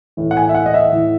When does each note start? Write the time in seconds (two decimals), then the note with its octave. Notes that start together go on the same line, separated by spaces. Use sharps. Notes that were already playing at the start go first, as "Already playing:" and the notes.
0.17 A2 E3
0.31 F#5
0.37 G#5
0.49 E5
0.55 F#5
0.66 D#5
0.74 E5
0.92 A2 E3